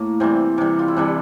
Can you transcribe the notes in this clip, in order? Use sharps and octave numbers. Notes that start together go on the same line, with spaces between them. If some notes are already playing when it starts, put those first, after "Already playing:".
Already playing: A2 A#3
C3 E3 G3 C4
C3 E3 G3
F4
E4
C3 E3 G3 D4